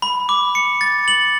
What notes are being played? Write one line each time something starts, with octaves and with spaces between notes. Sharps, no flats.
B5
D6
C#7
A6
F#7